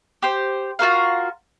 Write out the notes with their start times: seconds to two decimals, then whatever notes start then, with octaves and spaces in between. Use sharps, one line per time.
0.22 G4 C5
0.79 F4 F#4 A#4 F5